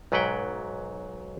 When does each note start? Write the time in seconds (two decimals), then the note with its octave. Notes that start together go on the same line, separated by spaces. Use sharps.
0.12 B1 G#2 F#3 B4 F#5 G5